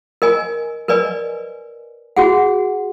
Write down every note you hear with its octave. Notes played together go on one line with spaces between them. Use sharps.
A#4 D#5 G#5
A#4 B4 D5 D#5 G#5
F#4 G#4 F#5